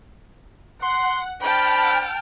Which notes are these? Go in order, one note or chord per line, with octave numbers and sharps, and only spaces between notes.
F#5 C6
D4 C5 G5 A5 B5 F6